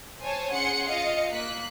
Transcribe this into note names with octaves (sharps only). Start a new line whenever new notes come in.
C5 C#5 G#5 A5
C#4 G#4 F#5 C6 C#7
F4 D#5 F5 C#7
A#3 F#6 B6